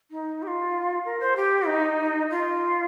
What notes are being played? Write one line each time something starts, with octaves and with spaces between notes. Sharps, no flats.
D#4
G4
F4
A#4
C5
G4
D#4
F4